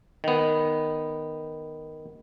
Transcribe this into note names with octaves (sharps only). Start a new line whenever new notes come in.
D#3 B3